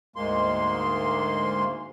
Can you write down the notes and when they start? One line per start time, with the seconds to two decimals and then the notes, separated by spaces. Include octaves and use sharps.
0.16 D2 G#2 G#3 A#3 C6